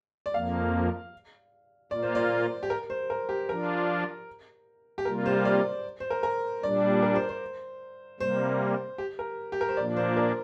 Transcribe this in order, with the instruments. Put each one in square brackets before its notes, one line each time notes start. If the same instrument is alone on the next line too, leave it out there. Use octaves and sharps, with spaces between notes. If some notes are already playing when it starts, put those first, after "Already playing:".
[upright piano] D5
[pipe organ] F2 F3 A#3 [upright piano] F5
[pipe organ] A#2 A#3 F4 [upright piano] D5
[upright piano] C5
D5
G4
A#4
C5
A#4
G4
[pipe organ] F3 D4 F4 [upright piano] A#4
[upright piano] G4
[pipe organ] C3 G3 A#3 F4 [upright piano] A#4
[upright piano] C5
D5
C5
A#4
A#4
[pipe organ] A#2 G3 D4 [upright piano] D5
[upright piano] A#4
C5
C5
[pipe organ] C3 G3 A#3 [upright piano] C5
[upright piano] G4
A#4
G4
A#4
C5
[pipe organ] A#2 F3 A#3 D4 [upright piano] D5
[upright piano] C5
A#4